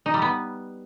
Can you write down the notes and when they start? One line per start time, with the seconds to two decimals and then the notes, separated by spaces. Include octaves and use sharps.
0.06 D#4
0.14 G3
0.22 B3